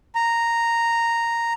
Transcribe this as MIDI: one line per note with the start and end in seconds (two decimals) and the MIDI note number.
0.15 1.53 82